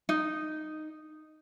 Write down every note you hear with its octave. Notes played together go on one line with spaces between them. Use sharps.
D#4